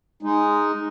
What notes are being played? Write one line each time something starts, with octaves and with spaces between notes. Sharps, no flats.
G#3 D#4